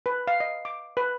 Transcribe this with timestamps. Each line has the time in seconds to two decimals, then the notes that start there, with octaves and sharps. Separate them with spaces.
0.06 B4
0.28 F5
0.40 D#5
0.65 D6
0.97 B4